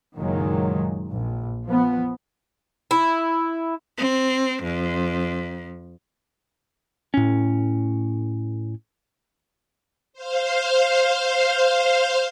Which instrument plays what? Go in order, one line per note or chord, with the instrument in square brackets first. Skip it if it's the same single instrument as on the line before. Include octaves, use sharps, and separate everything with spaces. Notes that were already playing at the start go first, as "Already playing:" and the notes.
[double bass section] F#1 A#2 D#3 F#3 G#3
A#1
F3 B3
[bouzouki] E4
[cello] C4
F2
[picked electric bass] A2 C#4
[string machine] C5 F5